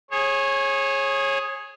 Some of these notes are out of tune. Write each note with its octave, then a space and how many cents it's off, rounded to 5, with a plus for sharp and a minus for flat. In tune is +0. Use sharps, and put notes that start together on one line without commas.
G#4 +0 C#5 -25